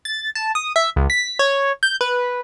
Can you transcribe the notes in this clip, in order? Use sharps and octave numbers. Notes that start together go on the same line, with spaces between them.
A6
A5
D#6
E5
C#2
B6
C#5
G6
B4